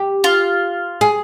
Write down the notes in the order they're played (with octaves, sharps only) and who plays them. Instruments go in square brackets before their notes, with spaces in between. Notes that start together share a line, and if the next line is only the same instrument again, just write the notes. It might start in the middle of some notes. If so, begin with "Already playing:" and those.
Already playing: [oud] G4
[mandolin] F4
[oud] G#4